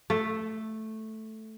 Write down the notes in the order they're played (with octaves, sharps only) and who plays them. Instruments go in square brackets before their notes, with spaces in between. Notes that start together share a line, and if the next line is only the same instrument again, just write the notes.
[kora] A3